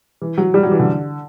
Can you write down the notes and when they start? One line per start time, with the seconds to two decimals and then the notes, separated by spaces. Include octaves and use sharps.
0.22 E3
0.38 F#3
0.54 G3
0.63 F#3
0.72 E3
0.80 D3